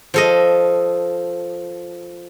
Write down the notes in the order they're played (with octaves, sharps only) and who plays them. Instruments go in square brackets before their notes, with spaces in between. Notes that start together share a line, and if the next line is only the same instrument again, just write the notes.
[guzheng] F3 A4 D#5